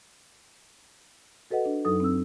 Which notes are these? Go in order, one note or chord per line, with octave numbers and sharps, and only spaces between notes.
F#4 A4 B4 D#5 F#5
D4
F#2 F#3 D#4 A4 D#6
C4 E6